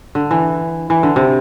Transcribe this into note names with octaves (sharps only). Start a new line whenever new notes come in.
D3
E3
E3
D3
C3